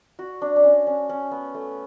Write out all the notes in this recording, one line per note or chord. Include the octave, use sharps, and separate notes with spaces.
F#4
D4
D4
C#4
C#4
C#4
B3
A3